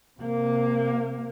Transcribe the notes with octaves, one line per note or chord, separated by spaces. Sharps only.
C3 A#3